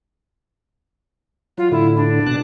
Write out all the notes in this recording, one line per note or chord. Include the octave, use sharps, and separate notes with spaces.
F#3 F4
A2 D3 E4
D4
B2 A5 F#6